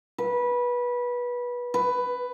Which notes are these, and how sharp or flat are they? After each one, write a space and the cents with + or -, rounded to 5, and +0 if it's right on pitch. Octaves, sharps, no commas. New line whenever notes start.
B4 -20
B4 +10